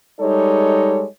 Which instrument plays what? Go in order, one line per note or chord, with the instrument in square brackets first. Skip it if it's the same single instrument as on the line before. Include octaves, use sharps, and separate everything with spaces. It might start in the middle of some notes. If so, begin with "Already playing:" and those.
[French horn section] G3 G#3 D#4 A4 C#5